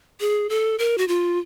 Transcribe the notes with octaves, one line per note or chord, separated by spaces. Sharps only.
G#4
A4
A#4
F#4
F4